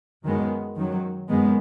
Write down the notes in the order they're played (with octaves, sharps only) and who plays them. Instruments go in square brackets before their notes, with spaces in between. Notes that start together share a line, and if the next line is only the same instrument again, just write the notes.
[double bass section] F#2 D#3 G#3 B3
F#2 D#3 F#3
F#2 D#3 G#3 B3